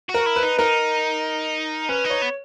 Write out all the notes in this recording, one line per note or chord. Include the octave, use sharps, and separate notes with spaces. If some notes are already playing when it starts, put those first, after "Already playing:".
F#4
A#4
E4
B4
D#4
D#4 A#4
C#4 B4
D#4
C#5
B3